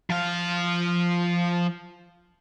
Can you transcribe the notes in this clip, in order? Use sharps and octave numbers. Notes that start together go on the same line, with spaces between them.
F3 F5